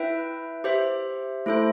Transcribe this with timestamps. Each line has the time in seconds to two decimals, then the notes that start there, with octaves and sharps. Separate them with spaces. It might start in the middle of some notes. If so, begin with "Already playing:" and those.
Already playing: E4 B4 E5 G5
0.64 G4 C5 E5
1.46 A3 E4 A4 C5